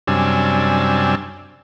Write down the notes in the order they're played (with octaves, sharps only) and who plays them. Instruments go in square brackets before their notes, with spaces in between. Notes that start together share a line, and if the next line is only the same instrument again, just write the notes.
[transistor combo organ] F#2 C3 G3 D4 G#5 E6